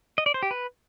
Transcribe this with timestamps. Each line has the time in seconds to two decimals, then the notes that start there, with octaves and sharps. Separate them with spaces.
0.18 D#5
0.26 D5
0.34 C5
0.43 G4
0.51 B4